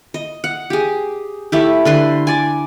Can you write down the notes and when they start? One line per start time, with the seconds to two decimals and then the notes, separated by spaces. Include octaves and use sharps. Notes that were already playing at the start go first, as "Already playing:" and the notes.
0.14 D#5
0.44 F#5
0.70 G4 G#4
1.52 A3 E4 G4
1.85 D3 B4 C6
2.27 D5 G#5